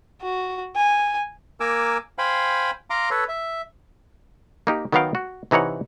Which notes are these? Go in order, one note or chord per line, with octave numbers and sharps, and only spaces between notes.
F#4
G#5
A#3 A#4 G#5 D6 E6
C5 F5 G5 G#5 B5
F5 A#5 C6 D6
A4 B4 C#5
E5
A#3 D#4 G4
D#3 F#3 B3 F#4 F5 G5
F#4
C3 E3 D#4 C#5 F#5